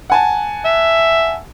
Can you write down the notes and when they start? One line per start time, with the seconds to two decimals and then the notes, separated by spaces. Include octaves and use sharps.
0.10 F#5 G#5 A5
0.65 E5